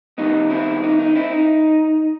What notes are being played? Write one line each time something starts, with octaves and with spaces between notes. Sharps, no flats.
D#3 G3 B3 D#4
C4 E4
D#4
D#4
C4 E4
D#4